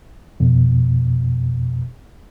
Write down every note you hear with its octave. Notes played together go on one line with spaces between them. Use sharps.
F2 B2